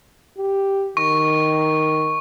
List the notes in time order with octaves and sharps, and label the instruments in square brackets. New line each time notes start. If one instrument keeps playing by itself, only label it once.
[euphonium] G4
[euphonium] D#3 [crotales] C#6